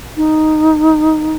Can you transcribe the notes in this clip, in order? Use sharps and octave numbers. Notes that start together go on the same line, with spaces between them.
D#4